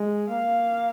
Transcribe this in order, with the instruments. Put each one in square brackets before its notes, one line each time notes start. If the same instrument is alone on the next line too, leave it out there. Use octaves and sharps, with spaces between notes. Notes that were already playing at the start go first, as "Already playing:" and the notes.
Already playing: [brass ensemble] G#3
[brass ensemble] A#3 [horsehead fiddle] F5